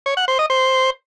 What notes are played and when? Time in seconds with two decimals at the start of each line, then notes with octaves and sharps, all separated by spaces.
0.06 C#5
0.17 F#5
0.28 C5
0.39 D#5
0.50 C5